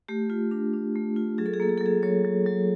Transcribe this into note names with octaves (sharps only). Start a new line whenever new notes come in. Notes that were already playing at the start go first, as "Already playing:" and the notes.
A3 G4
F4
D4
D4
A3
F4
F#3 G#4
A4
G#4
A#3 A4
G#4
A4
F#3
G#4
F#3 C#5
F#3
F#3